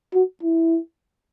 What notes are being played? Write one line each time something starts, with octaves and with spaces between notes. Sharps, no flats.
F#4
E4